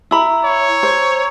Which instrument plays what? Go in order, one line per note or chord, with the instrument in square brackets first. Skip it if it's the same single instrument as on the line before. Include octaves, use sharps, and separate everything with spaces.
[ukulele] E4 B5 [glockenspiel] A#5 E6
[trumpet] C#5
[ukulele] C5